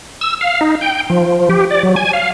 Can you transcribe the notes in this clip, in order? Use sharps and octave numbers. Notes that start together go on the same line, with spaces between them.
E6
F5
D#4
G5
F3
G4
D5
F#3
G#5
F5